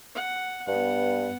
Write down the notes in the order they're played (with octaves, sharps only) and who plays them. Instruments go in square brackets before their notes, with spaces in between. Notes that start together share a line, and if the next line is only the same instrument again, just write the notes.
[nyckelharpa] F#5
[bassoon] G2 [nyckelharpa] B3 F#5